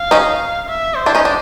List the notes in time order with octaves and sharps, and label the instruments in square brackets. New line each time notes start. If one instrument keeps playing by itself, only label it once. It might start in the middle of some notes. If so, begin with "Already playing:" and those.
Already playing: [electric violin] F5
[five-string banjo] C#4 D#4
[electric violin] E5
C5
[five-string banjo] D4 E4
C#4 D#4
D4